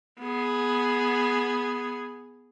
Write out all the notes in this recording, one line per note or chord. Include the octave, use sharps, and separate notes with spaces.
B3 G#4